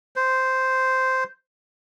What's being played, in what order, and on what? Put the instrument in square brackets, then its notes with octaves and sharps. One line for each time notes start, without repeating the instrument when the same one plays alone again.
[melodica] C5